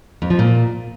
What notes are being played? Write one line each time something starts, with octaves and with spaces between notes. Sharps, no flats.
F2
F3
A#2